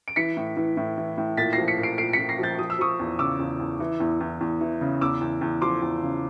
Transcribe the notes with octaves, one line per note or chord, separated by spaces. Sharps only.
D7
E3 B6 C#7
A2
E3
A2
E3
A2
A#2 A6 B6
A#6 C7
F3
B6 C#7
A#2
C7 D7
A#2 C7 D7
B6 C#7
A#2
A#6 C7
F3 G6 A6
F3 D#6
E6
F3 C#6 D#6
E2
C#3 D6 E6
E2
E2
E3
E2
E2
E2
E3
C#3
E2 D6 E6
E2
E2
F3 C6 D6
E2
C#3